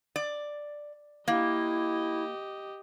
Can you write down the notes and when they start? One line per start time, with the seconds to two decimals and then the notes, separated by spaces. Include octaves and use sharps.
0.16 D5
1.28 A#3 E4 G4 D#5